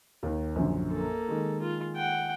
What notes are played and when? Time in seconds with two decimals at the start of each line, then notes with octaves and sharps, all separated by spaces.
0.23 D#2 D#3
0.56 A#1 F#2 D3
0.91 A#3 A4
1.28 D#3 G#3
1.61 F4
1.96 F#5 G5